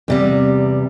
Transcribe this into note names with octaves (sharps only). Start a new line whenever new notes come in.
E2 C3 G3